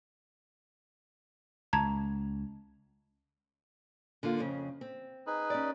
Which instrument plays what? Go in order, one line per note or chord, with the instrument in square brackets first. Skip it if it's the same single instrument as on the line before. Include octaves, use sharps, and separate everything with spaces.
[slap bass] C#2 [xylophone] A5 A#5 G#6
[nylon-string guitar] D3 A#3 F4
F2 C#3
C4
[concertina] D#4 G#4 B4
[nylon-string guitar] C#4 D5